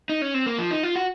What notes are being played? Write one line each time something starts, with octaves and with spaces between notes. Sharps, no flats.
D#4
C#4
C4
A#3
F3
D#4
F4
F#4